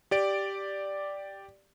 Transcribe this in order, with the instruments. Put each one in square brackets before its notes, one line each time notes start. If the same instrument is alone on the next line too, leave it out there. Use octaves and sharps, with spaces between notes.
[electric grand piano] G4 D5 D7